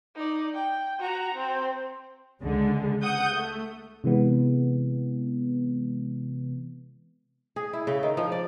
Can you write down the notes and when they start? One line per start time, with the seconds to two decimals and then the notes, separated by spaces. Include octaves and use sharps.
0.16 D#4 D5
0.54 G5
1.00 F#4 A#5
1.35 C4
2.42 C#2 D3 G#3
3.02 F#5 D#6 G6
3.34 A3
4.04 C3 E3 G#3 B3
7.56 G#4
7.73 E4
7.87 C#3
8.03 D#3
8.17 F3
8.32 D5